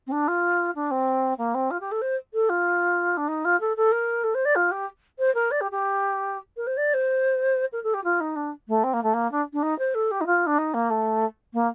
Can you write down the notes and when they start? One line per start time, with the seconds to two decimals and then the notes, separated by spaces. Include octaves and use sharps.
0.07 C4
0.11 D4
0.27 F4
0.75 D4
0.90 C4
1.38 A#3
1.54 C4
1.70 F4
1.80 G4
1.91 A4
2.01 C5
2.33 A4
2.49 F4
3.17 D4
3.28 D#4
3.44 F4
3.60 A4
3.76 A4
3.91 A#4
4.23 A4
4.34 C5
4.45 D5
4.55 F4
4.71 G4
5.18 C5
5.34 A#4
5.51 D5
5.60 G4
5.71 G4
6.56 A#4
6.66 C5
6.77 D5
6.93 C5
7.72 A#4
7.83 A4
7.94 G4
8.04 F4
8.20 D#4
8.35 D4
8.68 A3
8.83 C4
8.93 A#3
9.03 A3
9.13 A#3
9.31 D4
9.53 D4
9.62 D#4
9.78 C5
9.94 A4
10.11 G4
10.20 D#4
10.26 F4
10.46 D4
10.58 D#4
10.74 A#3
10.90 A3
11.53 A#3